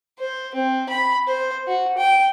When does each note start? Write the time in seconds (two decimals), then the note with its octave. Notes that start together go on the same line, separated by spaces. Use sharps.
0.19 C5
0.55 C4
0.89 B5
1.27 C5
1.68 F#4
1.98 G5